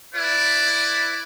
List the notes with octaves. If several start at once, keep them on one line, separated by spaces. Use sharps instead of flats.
E4 B4 D5